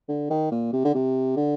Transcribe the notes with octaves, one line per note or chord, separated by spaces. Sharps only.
D3
D#3
A#2
C3
D3
C3
D3